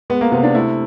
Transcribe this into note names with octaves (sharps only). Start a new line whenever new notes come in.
G#3 B3
A#3
C3 B3
D4
A3 E4